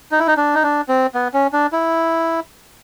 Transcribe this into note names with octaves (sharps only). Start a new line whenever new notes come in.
D#4
E4
D#4
D4
D#4
D4
C4
B3
C#4
D4
E4